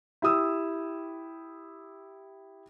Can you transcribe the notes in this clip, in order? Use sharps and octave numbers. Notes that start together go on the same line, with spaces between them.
E4 G4 D#6 E6